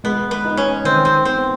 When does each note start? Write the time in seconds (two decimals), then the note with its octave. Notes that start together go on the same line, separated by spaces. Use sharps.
0.04 G#3 B3
0.31 B3
0.45 D#4
0.57 C#4
0.84 D#3 C4
1.05 C4
1.25 B3 C4